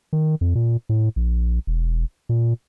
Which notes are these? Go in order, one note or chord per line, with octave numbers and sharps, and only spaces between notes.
D#3
F2
A#2
A2
A#1
E1
A#2